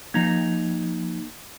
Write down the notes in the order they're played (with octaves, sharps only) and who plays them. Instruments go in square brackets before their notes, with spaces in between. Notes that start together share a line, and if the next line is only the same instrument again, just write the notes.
[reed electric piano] F3 G#6 [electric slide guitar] A#3 D#4 A#5